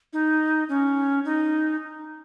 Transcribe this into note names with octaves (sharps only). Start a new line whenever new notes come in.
D#4
C#4
D#4